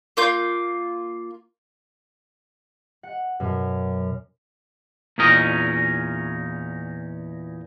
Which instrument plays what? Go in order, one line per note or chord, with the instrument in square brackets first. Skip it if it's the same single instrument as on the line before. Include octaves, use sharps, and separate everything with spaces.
[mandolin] A#3 F4 G6
[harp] F#5
F#2 B2
[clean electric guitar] E2 A#2 C#4 D#4 A#4 D#5